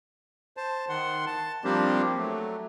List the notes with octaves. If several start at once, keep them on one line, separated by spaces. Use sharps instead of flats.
C5 A5
D#3 F#5 C6
A5
F3 G3 A#3 C4 D4 G4
F#3 A3